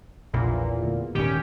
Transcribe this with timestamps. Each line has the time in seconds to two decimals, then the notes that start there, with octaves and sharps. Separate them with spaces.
0.33 A#1 E2 A#2
0.82 D2
1.15 D#1 G#2 D#3 C#4 G4